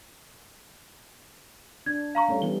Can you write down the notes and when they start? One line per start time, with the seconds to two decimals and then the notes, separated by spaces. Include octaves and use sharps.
1.86 D4 G#6
2.15 F5 A#5 C#6
2.28 G3 A3 C#4
2.42 E3 G3 B3 G7